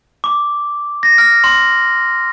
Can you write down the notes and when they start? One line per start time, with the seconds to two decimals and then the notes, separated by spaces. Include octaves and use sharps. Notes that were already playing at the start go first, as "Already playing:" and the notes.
0.24 D6
1.03 A#6
1.18 F6
1.44 C6